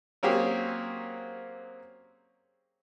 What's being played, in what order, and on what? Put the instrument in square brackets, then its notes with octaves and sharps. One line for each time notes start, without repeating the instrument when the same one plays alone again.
[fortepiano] F#3 A#3 C4 C#4 G4 G#4